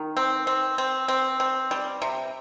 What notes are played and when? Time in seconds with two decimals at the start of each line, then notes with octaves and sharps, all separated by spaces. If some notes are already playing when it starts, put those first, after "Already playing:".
Already playing: D#3
0.17 C4
0.47 C4
0.78 C4
1.08 C4
1.40 C4
1.71 G3
2.02 C3